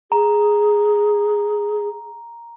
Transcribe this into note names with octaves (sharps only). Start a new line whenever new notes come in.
G#4 A#5